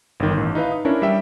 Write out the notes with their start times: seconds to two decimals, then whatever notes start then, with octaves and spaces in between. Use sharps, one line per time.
0.20 G1 D#3
0.37 A1
0.55 D#4 E4 B4 F5
0.72 D#6
0.85 C#4 D4 E4 A#4 C#5
1.02 G3 E5 G5